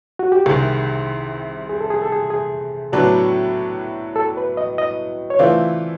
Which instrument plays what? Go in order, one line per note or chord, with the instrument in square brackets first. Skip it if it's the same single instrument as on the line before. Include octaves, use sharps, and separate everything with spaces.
[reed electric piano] F#4
G4
[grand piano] C2 C3 D#3 [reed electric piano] G#4
[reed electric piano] G#4
A4
G#4
A4
G#4
G#4
[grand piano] A2 F#3 B3 D4 [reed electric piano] A4
[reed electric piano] A4
B4
D#5
D#5
C#5
[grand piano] E3 A3 C4 F4 [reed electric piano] D5